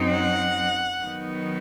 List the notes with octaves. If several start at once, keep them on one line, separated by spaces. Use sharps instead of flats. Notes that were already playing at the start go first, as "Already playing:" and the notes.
Already playing: F#2 F#3 C4 D#4
F#5
D#3 F#3 B3 D#4